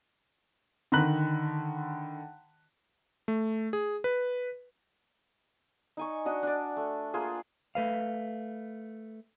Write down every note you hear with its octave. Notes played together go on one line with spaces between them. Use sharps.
D3 D#3 A#5 B5 F#6 F#7
A3
G#4
B4
D#4 G#5 C#6
D4 F#4 D#5
D4 D5
A3
A#3 F4 G#4 C5
A3 B4 F5